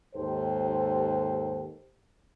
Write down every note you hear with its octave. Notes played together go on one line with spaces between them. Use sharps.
D#2 G#2 G4 A4 C5